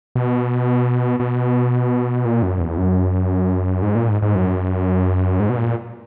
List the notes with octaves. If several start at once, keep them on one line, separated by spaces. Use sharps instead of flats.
B2
B2
A#2
F#2
E2
F#2
G#2
A#2
G#2
G#2
F#2
G#2
B2
A#2